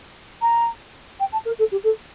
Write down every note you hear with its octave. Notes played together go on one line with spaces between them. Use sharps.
A#5
G5
A5
A#4
A4
G4
A4